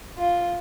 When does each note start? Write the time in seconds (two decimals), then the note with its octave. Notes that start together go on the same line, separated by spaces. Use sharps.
0.19 F4